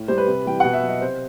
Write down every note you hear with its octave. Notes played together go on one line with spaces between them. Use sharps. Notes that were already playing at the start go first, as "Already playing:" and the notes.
Already playing: A2
G3 C5
B4
C3
E3 G3 G5
B2 F#5
E5
F#3 D#5
C3 C5